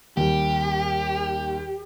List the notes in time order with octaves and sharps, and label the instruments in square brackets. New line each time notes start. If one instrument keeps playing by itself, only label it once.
[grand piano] D#2 G3 [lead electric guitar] G4